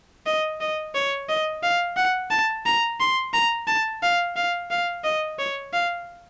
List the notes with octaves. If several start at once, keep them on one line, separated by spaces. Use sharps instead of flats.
D#5
D#5
C#5
D#5
F5
F#5
A5
A#5
C6
A#5
A5
F5
F5
F5
D#5
C#5
F5